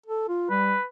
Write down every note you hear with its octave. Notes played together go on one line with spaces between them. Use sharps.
A4
F4
G3 B4